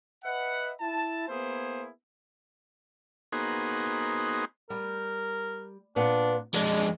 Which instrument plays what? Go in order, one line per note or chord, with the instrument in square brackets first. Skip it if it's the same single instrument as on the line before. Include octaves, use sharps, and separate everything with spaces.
[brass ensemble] B4 D#5 E5 F#5
E4 A5
A#3 B3 E4 G#4 C5
[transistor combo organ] A#3 B3 D#4 F#4 G#4 C5
[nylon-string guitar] G3 [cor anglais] A#4
[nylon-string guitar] A#2 B3 [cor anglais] D4
[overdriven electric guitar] F2 G#3 [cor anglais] D4 [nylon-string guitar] D5